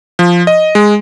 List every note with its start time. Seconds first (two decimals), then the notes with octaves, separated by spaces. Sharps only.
0.19 F3
0.47 D#5
0.75 G#3